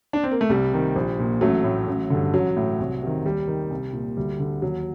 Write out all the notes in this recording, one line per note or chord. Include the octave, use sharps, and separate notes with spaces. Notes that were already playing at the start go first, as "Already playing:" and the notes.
D4
C4
A#3
A3
C2 G3
C3 D#3
A#1
A#2
A1 F#3 A3
A2
A1
G2 D3
A1 F#3
A2
C2
C3 D#3
D#2 G3
D#3
C2
A#2
D2 G3
D3
D#2 F#3